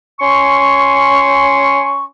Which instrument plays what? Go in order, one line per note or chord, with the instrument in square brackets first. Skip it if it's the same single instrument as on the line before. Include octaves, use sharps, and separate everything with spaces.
[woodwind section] C#4 G#5 C6 C#6